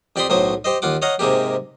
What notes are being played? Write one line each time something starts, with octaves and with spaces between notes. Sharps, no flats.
F2 G4 D5 B5 C6 D#6
B1 A2 F#3 C5 D#6
G4 C5 D#5
D#2 F4 F#5 D6
C#5 D#5 F5 F#5 A#5
G#2 C3 G#3 A#3 G4